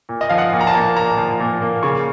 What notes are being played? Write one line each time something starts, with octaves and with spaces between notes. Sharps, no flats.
A#2
D#5
F3 F5
F#5
A#2
A#5
A5
A#3
A#2 A#5
F3
A#2
A#3
C#3 C#6